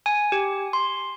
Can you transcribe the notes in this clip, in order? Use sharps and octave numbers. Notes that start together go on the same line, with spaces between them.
G#5
G4
C6